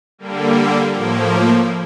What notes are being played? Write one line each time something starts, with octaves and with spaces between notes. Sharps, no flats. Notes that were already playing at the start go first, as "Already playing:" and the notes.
D3 G3 A#3
A2 F3 A#3